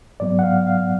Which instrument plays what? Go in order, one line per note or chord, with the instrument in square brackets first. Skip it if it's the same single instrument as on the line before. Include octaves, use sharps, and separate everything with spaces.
[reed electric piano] G#2 F#3 B3 D5
F#5
F5
F5